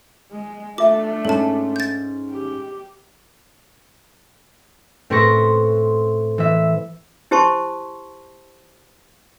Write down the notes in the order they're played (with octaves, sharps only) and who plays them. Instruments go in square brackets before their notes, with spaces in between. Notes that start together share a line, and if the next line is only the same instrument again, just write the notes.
[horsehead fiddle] G#3
[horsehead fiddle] A3 D4 [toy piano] F4 E5 G#5 [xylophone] D6
[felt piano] G#2 C#4 [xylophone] A4 A5
[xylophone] G6 A6
[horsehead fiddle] G4
[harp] A2 C4 A4 B4 C#6 A#6
E3 E5
[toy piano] E4 G4 C5 A5 C6 C#6